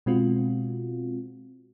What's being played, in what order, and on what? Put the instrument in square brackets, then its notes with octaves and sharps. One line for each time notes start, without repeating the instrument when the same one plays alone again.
[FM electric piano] B2 G#3 C4 F4 F#4